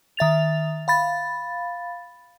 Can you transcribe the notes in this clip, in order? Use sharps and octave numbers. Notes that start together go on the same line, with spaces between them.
D#3 E5 A6 F7
F5 B5 A6